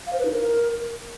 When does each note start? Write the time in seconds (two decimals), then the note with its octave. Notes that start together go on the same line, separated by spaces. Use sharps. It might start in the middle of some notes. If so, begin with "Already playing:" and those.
0.07 F5
0.13 C5
0.19 B4
0.25 D#4
0.31 A#4